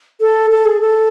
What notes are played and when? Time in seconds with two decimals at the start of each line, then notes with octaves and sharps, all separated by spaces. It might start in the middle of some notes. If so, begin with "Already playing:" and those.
0.21 A4
0.50 A4
0.66 G#4
0.81 A4